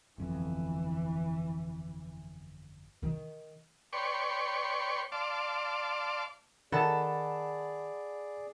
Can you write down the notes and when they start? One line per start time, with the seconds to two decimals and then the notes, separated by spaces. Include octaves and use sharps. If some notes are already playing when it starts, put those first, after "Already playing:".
0.18 G1 F2 E3
3.02 D#3
3.93 B4 C#5 D5 G5 C6 C#6
5.12 D5 F5 A5 C6 D6
6.72 D#3 G#4 A4 D5 F#5 A5 B5